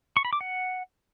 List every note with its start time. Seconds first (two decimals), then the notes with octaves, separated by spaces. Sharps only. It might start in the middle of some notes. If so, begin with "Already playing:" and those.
0.17 C#6
0.25 B5
0.33 D6
0.41 F#5